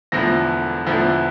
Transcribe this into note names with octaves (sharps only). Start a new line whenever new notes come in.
E1 E2 D3 F3 A3 A#6
E1 E2 D3 F3 A3